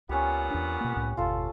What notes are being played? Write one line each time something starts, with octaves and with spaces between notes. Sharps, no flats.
C#2 A#2 B3 C#4 G4 F#5
E2 D4
B2 A#3
C2 A2 C#4
G1 E2 B2 F4 A4